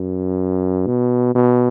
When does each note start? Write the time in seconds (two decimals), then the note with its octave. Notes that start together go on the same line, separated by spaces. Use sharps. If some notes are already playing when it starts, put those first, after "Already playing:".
Already playing: F#2
0.87 B2
1.35 B2